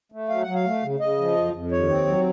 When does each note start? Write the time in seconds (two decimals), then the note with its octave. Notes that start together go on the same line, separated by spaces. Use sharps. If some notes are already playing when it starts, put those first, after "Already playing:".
0.12 A3
0.29 F#3 F5
0.42 F#5
0.47 F#3
0.54 F5
0.65 A3
0.83 C#3
1.00 C#3 D#5
1.18 F3
1.35 F2
1.53 F2
1.71 D#2 C#5
1.89 C4
2.07 F#3